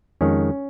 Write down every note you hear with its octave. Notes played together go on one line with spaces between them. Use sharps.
F2 D#3 G#3 C#4